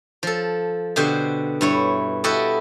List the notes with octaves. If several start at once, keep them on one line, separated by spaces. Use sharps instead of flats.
F3 A4
B2 D3 G4 C5 G5
G2 E4 C#5
E4 F#4 G4 A4 D#5